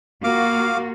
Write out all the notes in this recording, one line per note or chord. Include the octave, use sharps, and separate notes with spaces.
A#3 F4 F#4 F5 D6